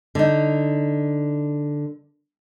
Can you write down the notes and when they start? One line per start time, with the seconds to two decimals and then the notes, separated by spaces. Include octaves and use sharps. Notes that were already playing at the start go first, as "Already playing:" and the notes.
0.15 D3 D#4